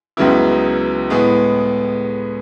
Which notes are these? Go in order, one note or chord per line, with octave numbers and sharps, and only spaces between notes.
C#2 C#3 F#3 B3 E4
A2 G#3 B3